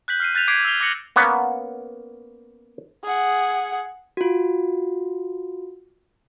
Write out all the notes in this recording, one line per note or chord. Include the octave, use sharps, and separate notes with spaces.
F#6 G6 B6 F#7
F6 C7 D#7
F#6 G6 A6 B6 D#7 F7
D6 G6 G#6 B6 C7 D7
E6 F6 B6 C7 F7 G7
D6 F#6 A#6 C#7 F#7
A#3 B3 C#4 F#5
G#4 F#5
F4 F#4